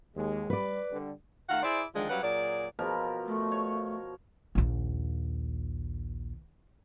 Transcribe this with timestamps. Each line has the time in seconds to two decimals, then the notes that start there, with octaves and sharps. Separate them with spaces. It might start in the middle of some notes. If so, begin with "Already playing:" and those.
0.15 D#2 G#3
0.50 G3 B4 D5
0.91 D3 G3
1.49 D#3 A3 A#4 F5 F#5
1.63 E4 G#4 C5 D5
1.95 D3 D#3 F3 G#3 D4 D#5
2.10 F#3 G3 C#4 B4 F5 F#5
2.22 A#2 F#3 G#4 D5
2.79 B2 F3 A#4
3.26 A3
3.52 C#5
4.55 A#1 D#2